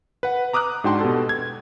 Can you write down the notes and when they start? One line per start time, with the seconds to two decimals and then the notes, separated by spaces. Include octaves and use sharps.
0.23 B4 F#5
0.53 A#5 D6 D#6 F6 F#6
0.84 G#2 D4 F#4 G5 A5 C6
1.00 B2 G4 A4
1.29 G#6